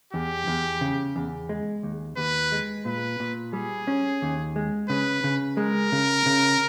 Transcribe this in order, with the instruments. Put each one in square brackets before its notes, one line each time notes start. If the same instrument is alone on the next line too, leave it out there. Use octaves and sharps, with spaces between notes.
[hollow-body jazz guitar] E2 [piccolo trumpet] G4
[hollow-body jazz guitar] E2
C#3
E2
G#3
D#2
[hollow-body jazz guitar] D#2 [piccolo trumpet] B4
[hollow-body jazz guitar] G#3
[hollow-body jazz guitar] A#2 [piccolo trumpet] B4
[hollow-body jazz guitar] A#2
[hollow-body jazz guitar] G3 [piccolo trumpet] G#4
[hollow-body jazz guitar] C#4
D#2
G#3
[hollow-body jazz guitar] C#3 [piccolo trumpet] B4
[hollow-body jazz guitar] C#3
[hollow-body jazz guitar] G#3 [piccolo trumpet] A#4
[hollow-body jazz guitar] C#3
C#3